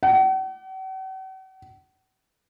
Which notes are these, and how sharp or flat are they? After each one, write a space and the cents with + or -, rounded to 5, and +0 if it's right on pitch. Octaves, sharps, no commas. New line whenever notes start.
F#5 +45